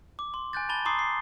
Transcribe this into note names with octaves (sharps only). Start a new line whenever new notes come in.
D6
C6
G#5 F#6 G6 A6
A5 B5 A6 G7
A#5 C6 D6 D#6 C7
C7